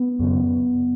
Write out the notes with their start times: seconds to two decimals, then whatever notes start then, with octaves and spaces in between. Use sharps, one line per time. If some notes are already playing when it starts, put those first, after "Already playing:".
Already playing: B3
0.19 F#2 C#3